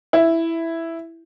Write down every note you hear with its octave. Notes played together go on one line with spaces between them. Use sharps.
E4